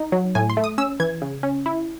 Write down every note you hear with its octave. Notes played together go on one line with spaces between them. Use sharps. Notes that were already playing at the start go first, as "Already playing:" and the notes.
Already playing: D#4
F#3
A2 G#5
C6
A3
D#6
C#4 E6
E3 G#6
C#3
C#4
E4